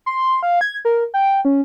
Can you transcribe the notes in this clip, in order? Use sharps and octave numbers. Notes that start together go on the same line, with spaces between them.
C6
F5
G#6
A#4
G5
C#4